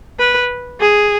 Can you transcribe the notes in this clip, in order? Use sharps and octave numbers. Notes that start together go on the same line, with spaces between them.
B4
G#4